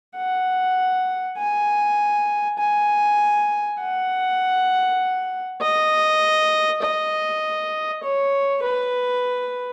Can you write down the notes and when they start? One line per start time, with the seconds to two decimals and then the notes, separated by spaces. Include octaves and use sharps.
0.17 F#5
1.38 G#5
2.59 G#5
3.80 F#5
5.62 D#5
6.83 D#5
8.03 C#5
8.63 B4